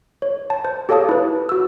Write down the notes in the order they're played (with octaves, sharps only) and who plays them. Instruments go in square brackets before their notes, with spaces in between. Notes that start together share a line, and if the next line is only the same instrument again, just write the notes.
[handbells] C#5
A5
C5
G4 A4 C#5 F5 A5 D#6
E4 B4
F#4 E6